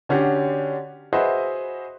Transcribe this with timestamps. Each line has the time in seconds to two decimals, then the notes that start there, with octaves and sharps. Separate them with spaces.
0.09 D3 C#4 D4 F#4 G4
1.13 F#4 G#4 B4 C5 D#5 E5